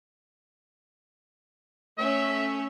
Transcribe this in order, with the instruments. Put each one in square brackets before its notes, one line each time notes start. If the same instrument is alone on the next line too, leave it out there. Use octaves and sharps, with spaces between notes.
[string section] A3 C#4 [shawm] E5